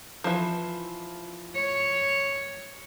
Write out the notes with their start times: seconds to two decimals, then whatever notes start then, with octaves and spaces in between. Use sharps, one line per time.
0.24 E3 F3
1.54 C#5